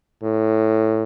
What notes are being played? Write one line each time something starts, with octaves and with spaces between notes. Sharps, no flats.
A2